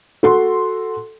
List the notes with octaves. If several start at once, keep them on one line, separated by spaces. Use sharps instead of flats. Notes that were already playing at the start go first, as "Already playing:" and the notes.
F#4 A4 C6